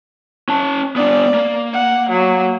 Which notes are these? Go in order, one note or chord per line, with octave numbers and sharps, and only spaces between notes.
C#4 A5
B3 D4 D5
A#3
F#5
F#3